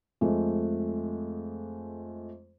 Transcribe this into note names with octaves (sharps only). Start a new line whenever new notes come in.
F2 G#3 A3